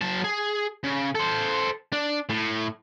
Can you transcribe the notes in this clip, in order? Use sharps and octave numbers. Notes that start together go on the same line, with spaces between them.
F#3 A5
G#4
C#3
A4 C5
D4
A2